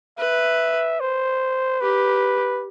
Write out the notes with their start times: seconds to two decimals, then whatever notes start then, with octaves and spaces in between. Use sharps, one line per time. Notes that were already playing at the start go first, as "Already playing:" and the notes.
0.18 B4 E5
1.00 C5
1.81 G4 B4